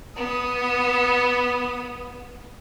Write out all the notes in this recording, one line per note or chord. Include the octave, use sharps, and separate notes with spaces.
B3 D#6